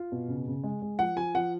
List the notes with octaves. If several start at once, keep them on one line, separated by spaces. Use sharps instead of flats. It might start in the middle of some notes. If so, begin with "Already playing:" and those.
Already playing: F4
B2
C#3
C#3
G#3
G#3
F3 F#5
F3 G#5
F3 F#5